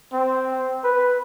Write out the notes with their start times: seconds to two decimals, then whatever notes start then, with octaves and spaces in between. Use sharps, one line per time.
0.13 C4
0.84 B4